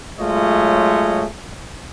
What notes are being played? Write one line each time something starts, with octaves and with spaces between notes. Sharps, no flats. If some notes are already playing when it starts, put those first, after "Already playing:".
F#3 G#3 A3 F4 C#5 D#5